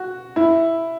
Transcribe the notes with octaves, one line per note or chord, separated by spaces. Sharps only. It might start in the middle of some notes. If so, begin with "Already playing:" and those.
Already playing: F#4
E4